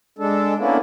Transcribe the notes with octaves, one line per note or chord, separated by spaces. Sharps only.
G#3 D4 A4
A#3 B3 C#4 D4 E4